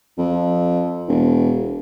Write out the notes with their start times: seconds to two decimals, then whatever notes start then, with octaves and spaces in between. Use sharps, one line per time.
0.18 F2
1.08 E1